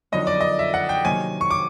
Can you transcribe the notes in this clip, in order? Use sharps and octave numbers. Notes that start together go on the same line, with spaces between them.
F2 D3 F#3 B3 D#4 D#5
D5
D#5
E5
F#5
G5
C3 D#3 F#3 A#3 G#5
C#6
D6